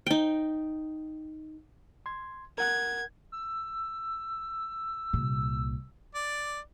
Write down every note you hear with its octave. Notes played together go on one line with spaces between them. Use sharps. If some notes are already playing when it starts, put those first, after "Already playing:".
D#4 G5
C6 G#6
A#4 F#5 F#6 G#6
E6
C2 A#2
D5